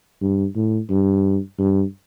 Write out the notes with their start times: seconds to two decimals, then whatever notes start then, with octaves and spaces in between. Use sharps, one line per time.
0.21 G2
0.56 A2
0.90 G2
1.59 G2